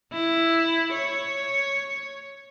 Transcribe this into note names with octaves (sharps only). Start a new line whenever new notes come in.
E4
C#5